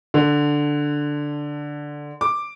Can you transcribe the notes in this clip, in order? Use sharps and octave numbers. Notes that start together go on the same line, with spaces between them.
D3
D6